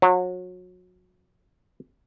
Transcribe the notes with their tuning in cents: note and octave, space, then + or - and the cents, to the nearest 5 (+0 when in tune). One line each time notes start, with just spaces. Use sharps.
F#3 -30